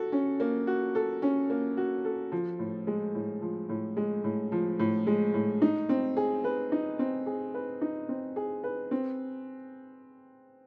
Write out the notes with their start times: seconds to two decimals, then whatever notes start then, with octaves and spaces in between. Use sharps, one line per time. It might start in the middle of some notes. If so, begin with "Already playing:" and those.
Already playing: F#4 A4
0.12 C#4
0.40 A#3
0.67 F#4
0.95 A4
1.22 C#4
1.50 A#3
1.77 F#4
2.05 A4
2.32 F3
2.59 A2
2.87 G#3
3.15 A2
3.42 F3
3.69 A2
3.97 G#3
4.24 A2
4.52 F3
4.79 A2
5.07 G#3
5.34 A2
5.62 D#4
5.89 C4
6.17 G#4
6.44 B4
6.72 D#4
6.99 C4
7.26 G#4
7.54 B4
7.81 D#4
8.09 C4
8.36 G#4
8.64 B4
8.91 C4